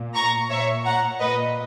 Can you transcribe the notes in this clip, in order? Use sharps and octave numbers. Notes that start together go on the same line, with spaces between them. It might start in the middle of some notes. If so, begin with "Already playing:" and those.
Already playing: A#2
A#5 C#6
A#2 C#5 E5
F#5 A#5
A#2 B4 D#5